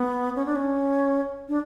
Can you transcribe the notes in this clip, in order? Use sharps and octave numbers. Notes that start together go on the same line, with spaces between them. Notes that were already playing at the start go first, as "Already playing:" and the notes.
Already playing: B3
C#4
D4
C#4
D4